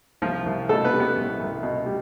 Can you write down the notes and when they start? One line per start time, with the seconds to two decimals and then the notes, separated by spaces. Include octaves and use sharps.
0.22 C2 F3 F4
0.46 C2
0.69 B2 A3 A4
0.84 B3 B4
0.93 G3
1.00 B3 B4
1.16 C2
1.39 C2
1.63 B2
1.86 G3